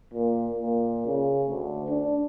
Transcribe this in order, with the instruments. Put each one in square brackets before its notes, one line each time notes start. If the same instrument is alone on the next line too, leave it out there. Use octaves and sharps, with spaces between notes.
[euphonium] A#2
A#2
C#3
D2
D4